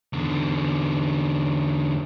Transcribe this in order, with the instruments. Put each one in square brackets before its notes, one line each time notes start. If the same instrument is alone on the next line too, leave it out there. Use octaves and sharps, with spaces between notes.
[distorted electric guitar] E2 D3